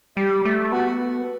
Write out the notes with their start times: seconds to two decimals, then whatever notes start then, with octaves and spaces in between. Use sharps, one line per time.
0.16 G3 G4
0.45 A3
0.72 B3 F#4